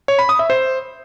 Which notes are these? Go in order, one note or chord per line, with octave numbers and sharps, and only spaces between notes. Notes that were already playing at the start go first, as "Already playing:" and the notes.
C#5
B5
D#6
E5
C5